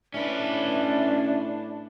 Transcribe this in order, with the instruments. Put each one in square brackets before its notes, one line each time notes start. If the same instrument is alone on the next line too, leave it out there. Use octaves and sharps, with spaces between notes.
[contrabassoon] A2 [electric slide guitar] C#4 B4 [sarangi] D4 [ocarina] E5